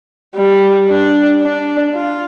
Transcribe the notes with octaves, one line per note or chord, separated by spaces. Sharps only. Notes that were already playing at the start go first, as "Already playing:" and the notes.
G3
D4
D4
F4